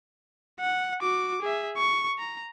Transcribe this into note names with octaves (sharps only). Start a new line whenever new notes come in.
F#5
F#4 D6
G#4 E5
C#6
A#5